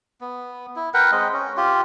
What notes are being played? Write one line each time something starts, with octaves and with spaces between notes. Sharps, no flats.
B3
E4
A#4 B4 F#5 G5
G#3 C4 D#5
C#4
F4 G4